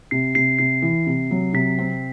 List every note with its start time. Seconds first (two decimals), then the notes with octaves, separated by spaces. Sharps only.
0.11 C3 C7
0.35 C3 C7
0.59 C3 C7
0.82 E3
1.07 C3
1.31 F#3
1.53 C3 B6
1.78 C4